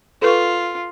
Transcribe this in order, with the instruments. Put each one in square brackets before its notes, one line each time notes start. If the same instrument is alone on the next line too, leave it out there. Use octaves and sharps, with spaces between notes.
[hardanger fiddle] F4 [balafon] A4 B4 C#6